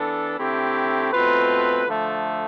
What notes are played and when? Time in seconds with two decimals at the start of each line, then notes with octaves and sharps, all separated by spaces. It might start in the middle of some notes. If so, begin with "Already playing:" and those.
Already playing: E3 B3 D4 A4
0.38 D3 A3 C4 E4 G4
1.12 B2 A3 C4 F4 B4
1.86 D3 F3 A3